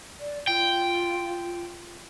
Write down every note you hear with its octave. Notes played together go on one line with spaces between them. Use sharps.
D5
F4 G5